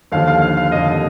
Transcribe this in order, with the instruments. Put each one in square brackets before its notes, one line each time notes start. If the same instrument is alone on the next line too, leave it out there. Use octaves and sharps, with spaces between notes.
[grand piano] D#2 D3 F3 F5
F5
F5
F5
F1 D#2 D3 D#5
D#5